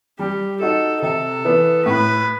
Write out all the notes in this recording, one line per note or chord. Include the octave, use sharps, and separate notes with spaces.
G3 G4
D#4 F#4 A4
C3 A4
E3 B3
A2 B4